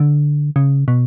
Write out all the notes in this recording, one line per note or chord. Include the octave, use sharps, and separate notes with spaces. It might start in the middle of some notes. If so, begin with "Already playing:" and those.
Already playing: D3
C#3
B2